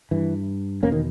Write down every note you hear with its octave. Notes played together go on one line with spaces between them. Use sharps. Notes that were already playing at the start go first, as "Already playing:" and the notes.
G2 E3
E2 B2 A#3 C#4
D#3